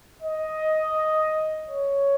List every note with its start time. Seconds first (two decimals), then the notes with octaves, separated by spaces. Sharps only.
0.22 D#5
1.69 C#5